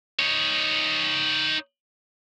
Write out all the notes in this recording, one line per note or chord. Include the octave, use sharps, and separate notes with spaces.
D#4 C#5